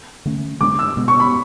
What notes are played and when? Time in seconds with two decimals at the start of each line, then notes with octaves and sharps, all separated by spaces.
0.26 D3 A3 C#4
0.61 D3 G#3 B3 D4 D6
0.79 E6
0.97 B2 G#3 B3
1.08 C#6
1.20 B5